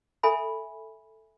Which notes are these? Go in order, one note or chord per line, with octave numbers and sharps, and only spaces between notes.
A4 E5 G#5 B5